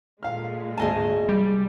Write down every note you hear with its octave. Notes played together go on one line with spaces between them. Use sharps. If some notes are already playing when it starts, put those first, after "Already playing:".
A#2 G#3 A3 F5 F6
G#1 D2 G#4 D#5 G#5 A5
C2 G3